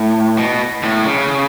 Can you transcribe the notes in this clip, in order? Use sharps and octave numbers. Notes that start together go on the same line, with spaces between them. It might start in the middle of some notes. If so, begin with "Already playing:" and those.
Already playing: A2
B2
A2
C#3